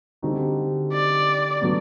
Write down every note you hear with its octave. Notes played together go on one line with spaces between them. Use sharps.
D3 G3 C4 D#4 F#4
D5
D3 F#3 B3